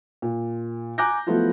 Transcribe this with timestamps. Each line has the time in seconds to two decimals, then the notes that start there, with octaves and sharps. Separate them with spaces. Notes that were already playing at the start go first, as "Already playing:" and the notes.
0.22 A#2
0.98 G#5 A#5 D6 F#6 G6 A#6
1.27 F3 F#3 A3 B3 E4 F4